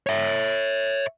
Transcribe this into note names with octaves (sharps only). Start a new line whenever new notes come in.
C#5 E5